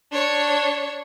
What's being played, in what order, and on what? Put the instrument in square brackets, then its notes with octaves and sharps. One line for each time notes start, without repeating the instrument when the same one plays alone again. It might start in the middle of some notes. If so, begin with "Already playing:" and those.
[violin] D4 C#5